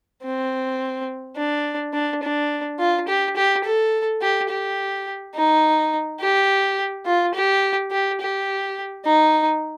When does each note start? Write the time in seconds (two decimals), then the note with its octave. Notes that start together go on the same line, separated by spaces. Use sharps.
0.23 C4
1.36 D4
1.93 D4
2.23 D4
2.79 F4
3.08 G4
3.36 G4
3.64 A4
4.21 G4
4.49 G4
5.36 D#4
6.21 G4
7.06 F4
7.34 G4
7.91 G4
8.21 G4
9.06 D#4